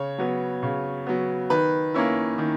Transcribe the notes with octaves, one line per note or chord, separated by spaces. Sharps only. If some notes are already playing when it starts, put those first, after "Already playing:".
Already playing: C#3 C#5
F#3 B3
C#3
F#3 B3
D#3 B4
A#3 C#4 E4
D#3